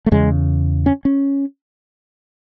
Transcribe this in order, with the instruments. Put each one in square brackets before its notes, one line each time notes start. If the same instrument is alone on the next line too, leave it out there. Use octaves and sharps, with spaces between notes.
[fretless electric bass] A3
E2 C#3 G#3
C#4
C#4